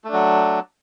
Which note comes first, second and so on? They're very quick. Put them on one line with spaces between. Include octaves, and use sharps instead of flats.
A3 D4 F#3